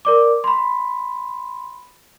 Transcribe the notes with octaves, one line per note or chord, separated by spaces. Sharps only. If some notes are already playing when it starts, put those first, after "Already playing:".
A#4 D5 D6
B5 C6